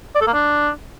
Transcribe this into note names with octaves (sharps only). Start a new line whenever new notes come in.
D5
A4
A#3
D4